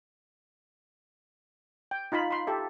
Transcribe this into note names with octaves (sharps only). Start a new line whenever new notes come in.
G5
D#4 F4 F5 B5
B5 C6
G4 A4 E5